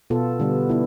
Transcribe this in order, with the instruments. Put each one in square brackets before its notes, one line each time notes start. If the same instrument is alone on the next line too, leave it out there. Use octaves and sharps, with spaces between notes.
[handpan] B2 B3 F4 A4
D3 G3 B3
B3 E4